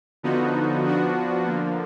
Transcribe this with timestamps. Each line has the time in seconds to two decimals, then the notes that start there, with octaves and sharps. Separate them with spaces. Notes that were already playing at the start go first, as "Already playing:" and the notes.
0.23 D3 F3 B3 D#4 F#4
0.84 F3 B3 D4 F#4
1.45 D3 F3 A#3